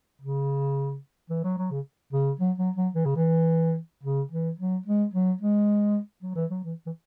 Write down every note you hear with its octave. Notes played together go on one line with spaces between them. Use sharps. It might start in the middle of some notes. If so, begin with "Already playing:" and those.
C#3
E3
F#3
F#3
C#3
C#3
F#3
F#3
F#3
E3
C#3
E3
C#3
E3
F#3
G#3
F#3
G#3
F#3
E3
F#3
E3
E3